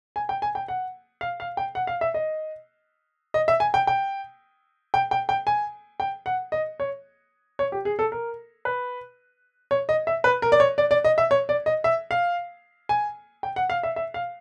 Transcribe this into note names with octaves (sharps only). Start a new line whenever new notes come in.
G#5
G5
G#5
G5
F#5
F5
F5
G5
F#5
F5
E5
D#5
D#5
E5
G#5
G5
G5
G5
G5
G5
G#5
G5
F#5
D#5
C#5
C#5
G4
G#4
A4
A#4
B4
C#5
D#5
E5
B4
A#4
D5
C#5
D5
D5
D#5
E5
C#5
D5
D#5
E5
F5
G#5
G5
F#5
F5
E5
E5
F5